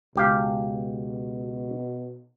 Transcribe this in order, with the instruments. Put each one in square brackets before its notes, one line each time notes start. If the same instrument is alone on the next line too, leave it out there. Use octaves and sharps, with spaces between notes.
[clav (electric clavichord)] C#2 G4 F5 [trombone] B2